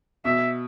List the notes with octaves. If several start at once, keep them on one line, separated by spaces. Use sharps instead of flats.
B2 E5